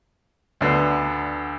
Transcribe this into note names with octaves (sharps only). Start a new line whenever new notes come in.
D2 D3 B3